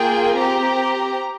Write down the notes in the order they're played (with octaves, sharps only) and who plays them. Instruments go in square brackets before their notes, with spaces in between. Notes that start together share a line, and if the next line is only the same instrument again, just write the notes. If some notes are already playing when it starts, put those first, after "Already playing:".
Already playing: [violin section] A#3 F4 G#4 G5
C4 G4 A#5